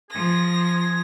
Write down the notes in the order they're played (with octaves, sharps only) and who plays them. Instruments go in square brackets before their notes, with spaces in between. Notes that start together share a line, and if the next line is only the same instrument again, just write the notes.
[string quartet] F3 A#6 [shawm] G#4